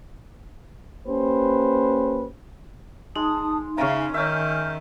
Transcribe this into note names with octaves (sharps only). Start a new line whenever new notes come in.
A#3 C#4 G4 B4 C5
G#3 D#4 A5 D#6
C#3 C#4 E5 F5 G#5 A#5
D#3 C#4 E5 F6 G6